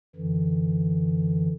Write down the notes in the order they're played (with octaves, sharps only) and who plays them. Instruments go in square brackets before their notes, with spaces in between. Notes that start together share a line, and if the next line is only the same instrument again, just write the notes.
[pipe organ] F#2 D3 E3